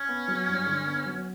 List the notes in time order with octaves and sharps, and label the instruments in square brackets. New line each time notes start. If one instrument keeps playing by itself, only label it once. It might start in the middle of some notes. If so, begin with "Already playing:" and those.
Already playing: [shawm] C#4
[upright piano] B3
F#3
G2
D3
B3
F#3